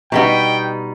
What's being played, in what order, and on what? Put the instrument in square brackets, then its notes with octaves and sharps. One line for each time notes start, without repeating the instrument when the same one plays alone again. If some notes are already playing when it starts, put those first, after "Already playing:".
[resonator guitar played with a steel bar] B2 G3 B3 D#4 [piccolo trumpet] G5